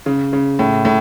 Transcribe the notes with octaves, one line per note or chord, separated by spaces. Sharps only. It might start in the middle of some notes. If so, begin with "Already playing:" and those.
C#3
C#3
A2
A2